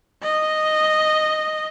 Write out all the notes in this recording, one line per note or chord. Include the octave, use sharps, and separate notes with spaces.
D#5